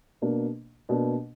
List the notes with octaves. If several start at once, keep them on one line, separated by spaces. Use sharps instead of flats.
B2 A#3 D4
B2 A#3 D4